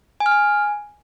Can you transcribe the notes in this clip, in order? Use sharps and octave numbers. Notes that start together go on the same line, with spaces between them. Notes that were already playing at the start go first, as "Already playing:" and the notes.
G#5
F6
G#5